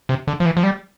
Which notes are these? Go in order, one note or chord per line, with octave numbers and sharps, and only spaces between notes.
C3
D3
F3
E3
F3
G3